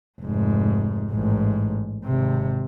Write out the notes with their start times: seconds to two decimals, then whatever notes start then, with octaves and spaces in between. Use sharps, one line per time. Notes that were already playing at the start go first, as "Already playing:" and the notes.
0.21 F1 G#2
1.12 A1 G#2
2.05 G#1 C3